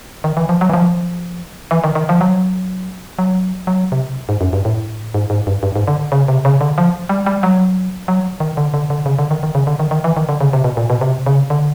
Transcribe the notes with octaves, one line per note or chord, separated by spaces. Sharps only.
D#3
E3
F3
F#3
E3
F3
E3
D#3
D#3
F3
F#3
F#3
F#3
C3
G#2
F#2
G2
A2
G#2
G#2
G2
G2
G#2
D3
C#3
C3
C#3
D3
F3
G3
G3
F#3
F#3
D#3
D3
D3
D3
C#3
D3
D#3
D#3
C#3
D3
D#3
D#3
E3
D#3
D3
C#3
C3
B2
A#2
B2
C3
C#3
D3